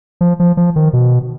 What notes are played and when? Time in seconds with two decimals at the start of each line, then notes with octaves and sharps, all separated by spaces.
0.21 F3
0.40 F3
0.57 F3
0.76 D#3
0.93 B2